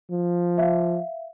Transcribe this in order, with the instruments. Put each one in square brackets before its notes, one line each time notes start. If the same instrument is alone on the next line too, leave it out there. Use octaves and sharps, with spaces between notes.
[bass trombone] F3
[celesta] E5 F5